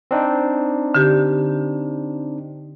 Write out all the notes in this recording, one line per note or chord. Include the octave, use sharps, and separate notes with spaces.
C4 D4 D#4
D3 G4